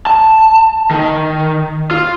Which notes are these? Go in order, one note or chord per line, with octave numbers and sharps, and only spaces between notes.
A5
D#3
F4